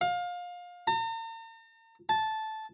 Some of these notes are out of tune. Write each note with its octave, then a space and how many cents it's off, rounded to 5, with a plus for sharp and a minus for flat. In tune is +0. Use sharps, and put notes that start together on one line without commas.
F5 +25
A#5 -45
A5 -10